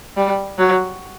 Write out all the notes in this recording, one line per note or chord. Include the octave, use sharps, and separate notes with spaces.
G3
F#3